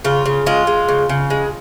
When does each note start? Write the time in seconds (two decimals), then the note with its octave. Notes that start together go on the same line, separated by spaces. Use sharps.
0.04 C#3 F4
0.26 C#3
0.46 G#3 F4
0.67 G#3
0.88 C#3
1.09 C#3
1.30 G#3